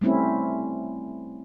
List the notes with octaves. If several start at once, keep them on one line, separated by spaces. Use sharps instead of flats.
G3 A3 C4 C#4 E4